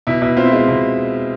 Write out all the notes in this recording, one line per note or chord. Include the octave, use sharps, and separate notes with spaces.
B2 E4
B2 E4
C4 F4
E4
G#3 F4
B2